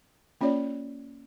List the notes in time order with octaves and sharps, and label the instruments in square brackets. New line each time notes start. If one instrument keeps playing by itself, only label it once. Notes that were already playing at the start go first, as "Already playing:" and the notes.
[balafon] A#3 C#4 F4 C#5 D5